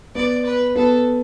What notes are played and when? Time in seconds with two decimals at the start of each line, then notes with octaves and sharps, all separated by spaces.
0.15 B3 D5
0.45 B4
0.76 B3 A4